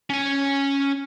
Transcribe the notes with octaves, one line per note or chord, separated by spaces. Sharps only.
C#4 G#5